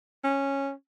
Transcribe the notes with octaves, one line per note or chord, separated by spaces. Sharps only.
C#4